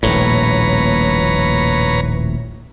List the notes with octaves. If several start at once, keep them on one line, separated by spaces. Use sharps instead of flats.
D#1 A#1 A2 B4 C#5 A#5